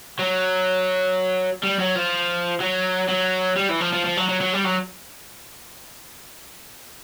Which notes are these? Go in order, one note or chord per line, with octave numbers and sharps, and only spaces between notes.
F#3
G3
F#3
F3
F#3
F#3
G3
E3
F3
F3
F3
F#3
F#3
F#3
G3
F#3